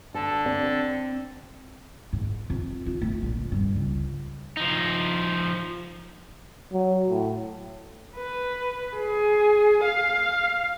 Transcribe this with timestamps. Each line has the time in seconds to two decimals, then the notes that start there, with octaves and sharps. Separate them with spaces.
0.15 D3 A4 A5
0.45 C4 D5
2.13 G#2
2.50 F2
2.86 F4
3.02 A3
3.23 A#1
3.36 A#2
3.52 G2
3.76 C#2
4.57 F3 D#4
6.73 F#3
7.10 A2
8.16 B4
8.97 G#4
9.84 F5